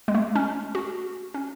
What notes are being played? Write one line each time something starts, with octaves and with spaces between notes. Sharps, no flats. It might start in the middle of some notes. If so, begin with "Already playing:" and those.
G#3
A3
C#4
F#4
C#4